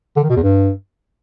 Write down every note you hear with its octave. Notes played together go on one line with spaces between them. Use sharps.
D3
D#3
B2
E2
G2